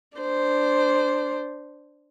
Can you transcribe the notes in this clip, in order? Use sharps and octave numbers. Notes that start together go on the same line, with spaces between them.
D4 C5